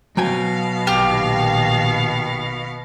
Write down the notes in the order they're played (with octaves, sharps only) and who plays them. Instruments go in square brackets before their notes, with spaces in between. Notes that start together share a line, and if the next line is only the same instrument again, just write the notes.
[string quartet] B2 F5 [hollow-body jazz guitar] F#3 G5 G#5
[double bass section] A#1 D#3 [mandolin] G4 F6